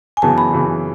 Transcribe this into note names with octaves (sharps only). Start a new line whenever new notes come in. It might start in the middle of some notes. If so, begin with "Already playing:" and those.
G#5
F#2 C#3 E3 B3 A5
B5
F#2 C#3 E3 B3